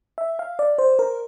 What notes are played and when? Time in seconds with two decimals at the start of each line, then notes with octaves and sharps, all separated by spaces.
0.18 E5
0.39 F5
0.59 D5
0.78 C5
0.99 A#4